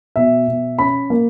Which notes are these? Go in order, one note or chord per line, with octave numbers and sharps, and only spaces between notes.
B2 E5
B2
C#4 B5
A#3